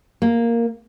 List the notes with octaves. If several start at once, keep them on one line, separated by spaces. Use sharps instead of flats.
A#3